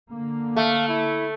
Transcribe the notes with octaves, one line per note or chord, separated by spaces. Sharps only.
D3 A#3
A3 F5
E4